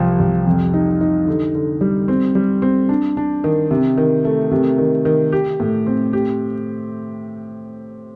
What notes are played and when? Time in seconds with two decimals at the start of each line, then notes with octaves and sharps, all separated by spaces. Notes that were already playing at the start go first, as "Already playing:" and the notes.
Already playing: C2 F3
0.19 C2
0.47 F2
0.74 D#4
1.01 D#4
1.27 D3
1.55 D3
1.81 G3
2.08 C4
2.35 G3
2.62 C4
2.89 D4
3.17 D4
3.44 D#3
3.71 C3
3.97 D#3
4.25 A3
4.51 C3
4.78 D#3
5.05 D#3
5.32 G4
5.60 A2
5.86 C4
6.13 G4